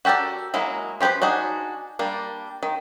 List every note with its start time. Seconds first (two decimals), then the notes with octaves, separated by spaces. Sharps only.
0.05 F#4 G4 A4 A#4 D5
0.54 F#3 G#3 A#3 E4
1.01 F3 G4 G#4 B4 C5
1.22 D4 D#4 F#4 G#4
1.99 G3 A#3 D4
2.63 D#3